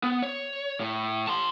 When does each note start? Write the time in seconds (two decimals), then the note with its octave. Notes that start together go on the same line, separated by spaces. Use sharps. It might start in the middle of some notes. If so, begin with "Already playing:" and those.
0.03 B3
0.23 C#5
0.80 A2
1.27 A5 C6